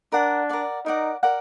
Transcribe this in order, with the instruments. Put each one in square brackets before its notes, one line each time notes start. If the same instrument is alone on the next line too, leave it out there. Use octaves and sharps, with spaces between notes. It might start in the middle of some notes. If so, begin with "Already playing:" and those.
[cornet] D4 [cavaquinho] A#4 D5 F#5
[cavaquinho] A#4 D5 F#5
[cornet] D#4 [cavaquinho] A#4 D5 F#5
[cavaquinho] A#4 D5 F#5